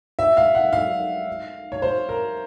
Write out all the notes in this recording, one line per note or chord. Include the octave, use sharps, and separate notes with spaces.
E5
F5
F#5
F5
C#5
C5
A#4